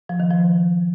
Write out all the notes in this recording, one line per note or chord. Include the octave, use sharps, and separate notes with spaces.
F3
D#3
F3